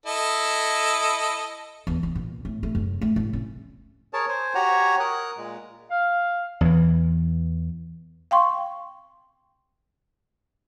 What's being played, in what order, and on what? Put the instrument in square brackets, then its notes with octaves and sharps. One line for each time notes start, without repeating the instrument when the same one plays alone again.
[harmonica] E4 A4 D#5
[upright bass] E2
E2
A#2
A2
A3
F#2
A3
A2
C#4
[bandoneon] G#4 A#4 C#5 A5
C5 G#5
F#4 G4 C#5 F#5 G#5 A#5
A#4 D#6 F#6
A#2 G#3
[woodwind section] F5
[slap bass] E2 E3
[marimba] F5 G5 C6 C#6